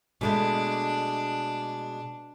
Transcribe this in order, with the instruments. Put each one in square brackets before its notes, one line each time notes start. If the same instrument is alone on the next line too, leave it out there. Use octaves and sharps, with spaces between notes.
[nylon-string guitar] B2 G#3 A3 [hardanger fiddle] D4